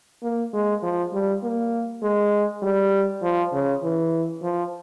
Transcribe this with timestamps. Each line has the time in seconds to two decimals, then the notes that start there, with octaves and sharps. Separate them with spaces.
0.23 A#3
0.54 G#3
0.83 F3
1.13 G3
1.43 A#3
2.03 G#3
2.63 G3
3.22 F3
3.53 C#3
3.82 E3
4.42 F3